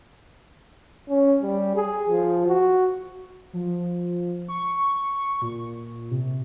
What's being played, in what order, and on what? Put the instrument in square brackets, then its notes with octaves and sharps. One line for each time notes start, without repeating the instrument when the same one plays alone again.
[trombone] C#4
G3
G#4
F3
F#4
[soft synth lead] F3
C#6
A#2
C3